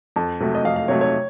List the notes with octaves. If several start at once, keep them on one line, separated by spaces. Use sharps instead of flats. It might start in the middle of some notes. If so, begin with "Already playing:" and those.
F2 A5
C3 F#3 A3
D#5
F2 F5
F5
C3 F#3 A3 C#5
C#5